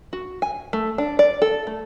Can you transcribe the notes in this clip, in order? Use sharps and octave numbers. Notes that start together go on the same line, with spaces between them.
F#4
G#5
A3
D4
D5
A4
A3